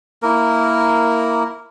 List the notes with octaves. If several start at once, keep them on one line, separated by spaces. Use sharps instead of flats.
A#3 E4 A#4